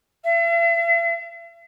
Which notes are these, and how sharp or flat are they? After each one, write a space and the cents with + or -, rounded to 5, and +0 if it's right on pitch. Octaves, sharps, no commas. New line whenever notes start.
E5 +45